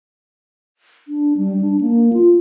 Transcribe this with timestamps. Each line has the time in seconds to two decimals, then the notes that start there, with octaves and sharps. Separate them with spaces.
1.08 D4
1.37 G3
1.61 D4
1.81 A#3
2.13 F4